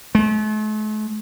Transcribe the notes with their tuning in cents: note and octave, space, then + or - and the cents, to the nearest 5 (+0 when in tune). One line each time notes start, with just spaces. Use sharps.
A3 -45